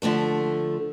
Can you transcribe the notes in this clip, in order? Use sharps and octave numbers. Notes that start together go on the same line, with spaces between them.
D3 F3 A3 A4